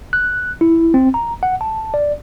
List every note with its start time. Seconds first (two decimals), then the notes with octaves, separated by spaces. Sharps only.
0.13 F#6
0.61 E4
0.94 C4
1.14 A#5
1.43 F#5
1.61 A5
1.94 D5